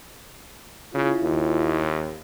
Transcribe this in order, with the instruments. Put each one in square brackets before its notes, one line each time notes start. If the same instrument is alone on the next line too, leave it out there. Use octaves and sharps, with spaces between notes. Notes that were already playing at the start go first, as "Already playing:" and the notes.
[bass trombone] C#3 [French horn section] E4 F4
[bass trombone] D#2